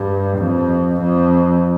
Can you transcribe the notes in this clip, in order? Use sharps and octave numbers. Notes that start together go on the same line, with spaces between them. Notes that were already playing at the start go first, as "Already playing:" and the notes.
Already playing: G2
F2
F2